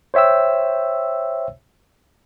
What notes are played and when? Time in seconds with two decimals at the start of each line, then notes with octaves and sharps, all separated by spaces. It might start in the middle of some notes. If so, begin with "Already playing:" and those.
0.14 C5 C#5 E5 G5 E6